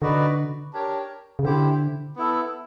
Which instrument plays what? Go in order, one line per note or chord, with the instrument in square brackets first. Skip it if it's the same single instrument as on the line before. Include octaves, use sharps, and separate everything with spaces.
[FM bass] D3 [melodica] D#4 F#4 B4 D5
[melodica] D4 G4 A#4 C#5
[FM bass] C#3
[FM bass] D3 [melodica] E4 G4 C5
[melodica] B3 E4 A4